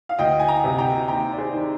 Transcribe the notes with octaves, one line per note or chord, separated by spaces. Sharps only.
F5
D2 D#5 G5
G#5
G5 A#5
C3
G5 A#5
D#2 G5 A#5
D5
G#4 C5
D#3